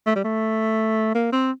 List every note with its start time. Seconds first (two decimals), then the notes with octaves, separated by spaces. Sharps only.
0.06 A3
0.16 G3
0.24 A3
1.15 A#3
1.32 C4